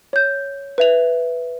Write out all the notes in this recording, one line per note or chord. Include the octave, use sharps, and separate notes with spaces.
C#5 G6
B4 E5 F7